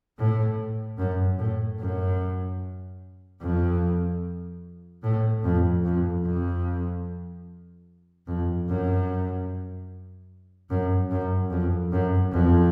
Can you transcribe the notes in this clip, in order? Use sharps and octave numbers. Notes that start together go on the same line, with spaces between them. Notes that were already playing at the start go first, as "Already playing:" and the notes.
A2
F#2
A2
F#2
F2
A2
F2
F2
F2
F2
F#2
F#2
F#2
F2
F#2
F2